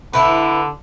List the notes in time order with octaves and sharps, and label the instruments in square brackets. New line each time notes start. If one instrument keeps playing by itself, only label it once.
[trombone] D3 [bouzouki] E4 B4